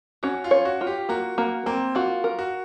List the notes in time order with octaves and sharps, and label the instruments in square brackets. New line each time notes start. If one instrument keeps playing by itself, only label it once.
[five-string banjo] C#4 [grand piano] F#4
[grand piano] F4
[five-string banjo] C#5
[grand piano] F#4
[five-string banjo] F4
[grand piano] G4
[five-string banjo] A#3 [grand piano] F#4
[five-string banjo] A#3 [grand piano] F#4
[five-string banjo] A#3 [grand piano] C4
[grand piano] F4 [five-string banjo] F#4
[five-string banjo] A#4
[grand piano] F#4